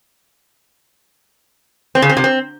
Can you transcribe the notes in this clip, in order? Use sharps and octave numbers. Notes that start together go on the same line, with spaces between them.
C4
C#3
C4
C3
C4